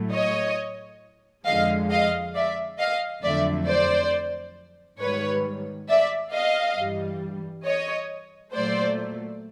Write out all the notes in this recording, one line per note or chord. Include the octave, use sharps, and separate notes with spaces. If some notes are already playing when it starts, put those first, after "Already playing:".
Already playing: A2 F#3 A3
C#5 D#5
F2 D3 F3 G#3 D#5 F5
D#5 F5
D5 E5
D#5 F5
F2 D3 F#3 A3 D5 E5
C5 D5
G#2 D#3 G3 B4 C#5
D5 E5
D#5 F5
G2 E3 G3
C#5 D#5
A#2 F#3 A3 C5 D5